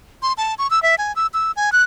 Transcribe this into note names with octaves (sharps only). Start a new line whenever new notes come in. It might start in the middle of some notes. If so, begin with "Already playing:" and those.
C6
A5
C#6
E6
E5
G#5
E6
E6
G#5
F#6